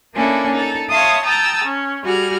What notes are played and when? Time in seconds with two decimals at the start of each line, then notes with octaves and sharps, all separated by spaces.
0.14 A#3 C#4 D4 E4 A4
0.51 D#4 A4
0.89 C#5 E5 F5 A5 C6 D#6
1.24 G5 A5 A#5 D#6 E6 A6
1.64 C#4
2.05 G3 F#4 G#4 F6